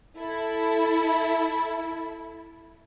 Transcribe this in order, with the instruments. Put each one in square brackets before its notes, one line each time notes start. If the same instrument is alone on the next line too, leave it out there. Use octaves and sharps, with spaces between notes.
[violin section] E4 A4